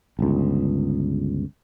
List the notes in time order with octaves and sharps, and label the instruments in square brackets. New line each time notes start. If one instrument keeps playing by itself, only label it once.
[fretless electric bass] G1 C#2